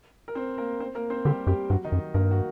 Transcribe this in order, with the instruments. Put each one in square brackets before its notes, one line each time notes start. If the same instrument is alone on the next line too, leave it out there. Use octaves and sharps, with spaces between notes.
[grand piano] A#4
C4 C5
A#3 A#4
C4 C5
A#3 A#4
C4 C5
[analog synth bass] D3 [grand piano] G3 G4
[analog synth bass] F#2 [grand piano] G3 G4
[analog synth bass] G2 [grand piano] F#3 F#4
[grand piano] D#3 D#4
[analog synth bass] F#2
[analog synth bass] G2 [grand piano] A#3 A#4
[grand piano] F#4